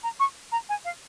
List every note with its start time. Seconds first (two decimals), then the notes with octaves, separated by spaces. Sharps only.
0.03 A#5
0.20 C#6
0.52 A#5
0.69 G#5
0.85 F5